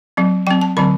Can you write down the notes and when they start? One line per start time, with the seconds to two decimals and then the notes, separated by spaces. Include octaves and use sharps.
0.17 F#3 C4
0.47 F#3 C4 G5
0.61 A5
0.77 D3 F#3 C4 B5